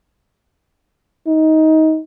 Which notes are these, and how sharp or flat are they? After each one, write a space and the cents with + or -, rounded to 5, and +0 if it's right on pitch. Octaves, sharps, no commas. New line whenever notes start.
D#4 +20